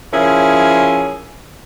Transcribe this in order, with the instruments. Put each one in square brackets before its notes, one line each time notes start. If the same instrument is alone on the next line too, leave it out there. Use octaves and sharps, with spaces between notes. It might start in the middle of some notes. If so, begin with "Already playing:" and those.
[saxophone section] F3 C#4 E4 G#4 A#4 C#5